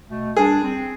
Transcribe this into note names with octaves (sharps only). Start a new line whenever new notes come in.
B2 A3
G3 D4 G#4
C4